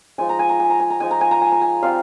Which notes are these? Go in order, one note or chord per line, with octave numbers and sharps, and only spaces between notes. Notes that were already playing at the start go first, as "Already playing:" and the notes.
F3 G#3 D#4 G#5
A#5
G#5
A#5
G#5
A#5
G#5
A#5
F3 G#3 D#4 G#5
A#5
G#5
A#5
G#5
A#5
G#5
G3 C4 F4 F5